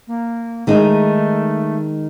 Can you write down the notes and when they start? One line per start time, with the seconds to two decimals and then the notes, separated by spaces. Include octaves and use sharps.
0.07 A#3
0.67 D#3 G#3 A3 D#4